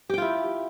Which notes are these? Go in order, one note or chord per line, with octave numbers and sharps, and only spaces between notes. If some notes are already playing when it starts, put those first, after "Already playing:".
E4 F4 G4 G5